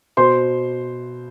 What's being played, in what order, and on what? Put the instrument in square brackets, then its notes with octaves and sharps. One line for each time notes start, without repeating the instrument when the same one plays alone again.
[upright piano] B2 C5 C6